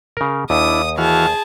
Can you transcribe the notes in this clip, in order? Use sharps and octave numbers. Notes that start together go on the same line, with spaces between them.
C#3 A#4
D#2 D4 E4 D#6
E3 F#4 G#4 A5 F6